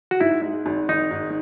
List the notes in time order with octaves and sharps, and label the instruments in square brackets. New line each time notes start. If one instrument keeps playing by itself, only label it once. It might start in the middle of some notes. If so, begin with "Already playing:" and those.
[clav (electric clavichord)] F#4
[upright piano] G#2 [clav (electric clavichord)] E4
[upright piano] G#3
G#1
[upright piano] D#3 [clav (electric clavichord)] D#4
[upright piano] G#2